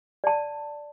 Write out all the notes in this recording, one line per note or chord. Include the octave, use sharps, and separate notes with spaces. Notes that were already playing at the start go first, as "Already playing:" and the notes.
D5 A5